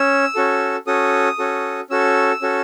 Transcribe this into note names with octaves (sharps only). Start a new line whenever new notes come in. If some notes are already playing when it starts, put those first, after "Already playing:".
Already playing: C#4 E6
C#4 F#4 A4
C#4 F#4 A4 D#6
C#4 F#4 A4
C#4 F#4 A4 E6
C#4 F#4 A4